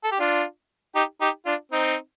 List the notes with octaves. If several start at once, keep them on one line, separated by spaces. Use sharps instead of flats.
A4
G4
D4 F4
D#4 G4
D#4 G4
D4 F4
C4 D#4